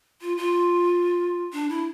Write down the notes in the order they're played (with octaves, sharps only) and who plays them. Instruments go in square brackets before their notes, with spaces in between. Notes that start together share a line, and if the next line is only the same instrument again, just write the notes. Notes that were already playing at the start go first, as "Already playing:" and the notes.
[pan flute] F4
F4
D4
E4